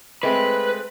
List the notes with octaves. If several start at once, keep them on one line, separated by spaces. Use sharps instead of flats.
G#3 A3 C4 B4